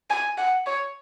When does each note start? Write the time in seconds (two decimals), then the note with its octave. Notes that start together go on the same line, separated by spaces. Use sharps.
0.10 G#5
0.38 F#5
0.66 C#5